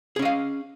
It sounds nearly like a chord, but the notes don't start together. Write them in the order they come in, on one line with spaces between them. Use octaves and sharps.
G#4 C#4 D#5 F5